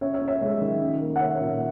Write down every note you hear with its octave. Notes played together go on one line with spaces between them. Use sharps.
C#4 C#5 E5
C#5 E5
C#4
C#5 E5
G#3
D#3
C#4
A#3
F#5
A#3 C#5 E5
A#2